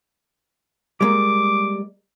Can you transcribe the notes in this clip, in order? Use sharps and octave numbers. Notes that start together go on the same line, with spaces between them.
G3 G#3 A#3 D6